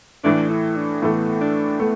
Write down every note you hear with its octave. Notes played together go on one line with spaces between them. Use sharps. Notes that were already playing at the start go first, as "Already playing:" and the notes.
A2 E3 A3 D4
E4
D4
A2 E3 A3 B3
D4
A3 B3